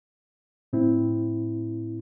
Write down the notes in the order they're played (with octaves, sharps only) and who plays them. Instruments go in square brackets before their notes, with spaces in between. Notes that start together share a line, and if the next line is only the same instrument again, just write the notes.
[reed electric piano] A2 C4 E4